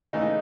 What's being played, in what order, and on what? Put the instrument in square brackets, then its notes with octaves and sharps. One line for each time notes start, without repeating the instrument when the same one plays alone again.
[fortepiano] C#3 E3 A3 D#4